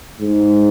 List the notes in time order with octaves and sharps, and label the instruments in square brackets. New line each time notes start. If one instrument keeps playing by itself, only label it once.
[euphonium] G#2